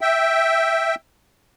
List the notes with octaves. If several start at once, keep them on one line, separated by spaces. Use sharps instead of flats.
E5 G5